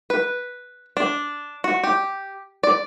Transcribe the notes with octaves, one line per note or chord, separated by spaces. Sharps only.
B4
D4
F#4
G4
D5